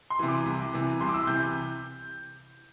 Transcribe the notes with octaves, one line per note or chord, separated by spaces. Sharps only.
C6
C3 E3
D6
C2
C3 E3
C2 C6
D6
E6
C3 E3 G6